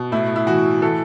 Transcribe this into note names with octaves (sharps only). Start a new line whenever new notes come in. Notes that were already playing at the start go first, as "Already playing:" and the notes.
Already playing: B2
A2 E4
E4
E3 F#4
E3 A4